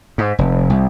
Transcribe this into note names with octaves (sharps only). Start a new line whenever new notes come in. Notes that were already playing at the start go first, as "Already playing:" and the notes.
G#2
F1
C2